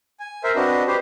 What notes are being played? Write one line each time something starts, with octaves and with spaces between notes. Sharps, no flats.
G#5
A#4 C5 E5
C4 D4 F#4 B4 D#5
G4 B4 C5